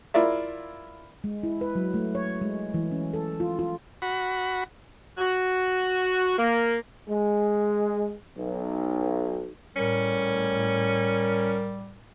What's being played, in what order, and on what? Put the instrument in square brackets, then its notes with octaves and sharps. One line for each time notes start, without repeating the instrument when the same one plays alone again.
[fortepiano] E4 F4 A#4 D5 E5
[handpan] G#3
E4
B4
F#3
A3
C#5
G#3
E3
C#4
A4
F4
F4
[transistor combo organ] F#4 B5
[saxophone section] F#4
A#3
[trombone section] G#3
B1
[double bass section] A2 [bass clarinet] G3 [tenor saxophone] C#4 [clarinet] A#4